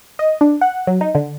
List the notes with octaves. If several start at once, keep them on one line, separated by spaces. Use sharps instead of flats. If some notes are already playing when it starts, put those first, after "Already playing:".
D#5
D4
F#5
F#3
D#4
D3